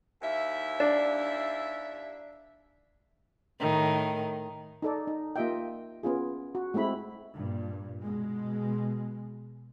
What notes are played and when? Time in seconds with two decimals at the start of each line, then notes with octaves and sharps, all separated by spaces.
0.22 D#2 E4 E5
0.80 D4
3.60 A2 D#3
4.82 D#4 A4 D5
5.07 D#4
5.36 A#3 F4 G4 D#5 E5 G5
6.03 B3 C#4 F4 G#4
6.55 F#4
6.74 G#3 A3 C4 E4 B5
7.36 G2 A#2
8.01 B2 G#3